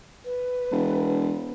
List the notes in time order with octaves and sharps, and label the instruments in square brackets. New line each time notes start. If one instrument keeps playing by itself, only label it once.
[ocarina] B4
[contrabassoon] E1